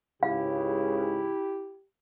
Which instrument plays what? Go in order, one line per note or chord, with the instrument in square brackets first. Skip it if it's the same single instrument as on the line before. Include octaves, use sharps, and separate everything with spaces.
[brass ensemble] C#2 G#2 C#3 [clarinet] E4 [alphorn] G4 [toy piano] F5